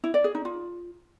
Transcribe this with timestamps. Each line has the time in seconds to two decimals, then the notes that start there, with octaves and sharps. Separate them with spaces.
0.04 E4
0.14 D5
0.24 G#4
0.35 D#4
0.45 F4